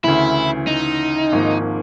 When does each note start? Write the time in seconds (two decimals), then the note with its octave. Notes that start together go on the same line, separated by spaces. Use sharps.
0.04 D2 C#3 E3 E4
0.67 D#4
1.32 G#1 G#2 F3 A#3